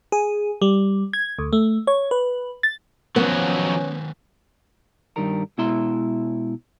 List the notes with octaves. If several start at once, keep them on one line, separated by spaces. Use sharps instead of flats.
G#4
G3
G#6
D2
A3
C#5
B4
A6
F2 D#3 F#3 B3 C#4 B4 C5
G2 D#3 G3 A#4 A#5
B2 G#3 E4 E5 A#5 C6